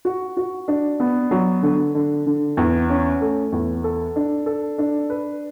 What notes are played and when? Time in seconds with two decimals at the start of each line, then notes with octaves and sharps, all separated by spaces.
0.05 F#4
0.37 F#4
0.68 D4
1.00 B3
1.31 F#3
1.63 D3
1.95 D3
2.26 D3
2.57 E2
2.90 C#4
3.21 A3
3.52 E2
3.84 A4
4.16 D4
4.46 A4
4.78 D4
5.10 B4